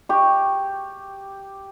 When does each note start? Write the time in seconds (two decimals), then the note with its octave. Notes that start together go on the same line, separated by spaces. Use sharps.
0.09 G4 C#6